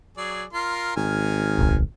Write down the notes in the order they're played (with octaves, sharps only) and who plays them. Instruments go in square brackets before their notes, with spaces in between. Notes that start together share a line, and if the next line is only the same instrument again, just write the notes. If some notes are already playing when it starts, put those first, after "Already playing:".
[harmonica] F#3 G#4 D5
F4 A#4 C6
[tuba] G#1 [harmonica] D#3 G#5 F6
[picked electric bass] D1 B1